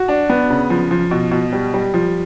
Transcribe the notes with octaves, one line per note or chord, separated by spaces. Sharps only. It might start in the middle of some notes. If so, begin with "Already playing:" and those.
Already playing: F#4
D4
B3
C#3
F3
F3
B2
B2
G3
G3
F3